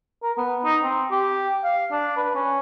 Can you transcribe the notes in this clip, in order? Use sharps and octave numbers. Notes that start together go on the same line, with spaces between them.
A#4
B3
D#4
C4
G4
F5
D4
B4
C#4